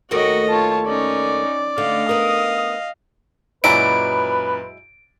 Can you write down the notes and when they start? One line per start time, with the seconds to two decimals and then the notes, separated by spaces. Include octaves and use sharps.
0.11 D#2 A3 F#4 A#4 D#5
0.49 F4 C#5 A5
0.86 C#4 D#4 D5
1.78 D3 A3 D#5 F5
2.09 B3 A#4 D#6
3.64 F#2 A#2 F#3 G#3 E4 B4 D5 D7